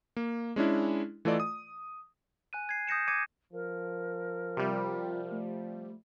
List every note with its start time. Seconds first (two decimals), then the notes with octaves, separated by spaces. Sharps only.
0.17 A#3
0.56 G#3 C#4 D4 E4
1.25 E3 A3 F4 A4 D5 D#5
1.40 D#6
2.53 G#5 F#6 D#7
2.69 G#6 C7
2.87 D#6 G6 A#6 C#7 E7
3.08 D6 G#6 C#7 D#7
3.53 F3 A#4
4.57 C3 G3 F4
5.32 A3